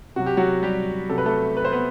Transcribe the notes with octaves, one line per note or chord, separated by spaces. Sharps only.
C3 F#3 F#4
G4
F#3 F#4
G3 G4
C3 F#3 A4
B4
A3 A4
B4
C5
B3 B4